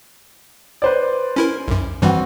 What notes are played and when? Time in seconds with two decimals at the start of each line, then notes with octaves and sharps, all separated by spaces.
0.82 B4 C5 D5
1.36 C#4 E4 A#4
1.68 B1 F#2
2.02 G2 E3 G3 C4 F#4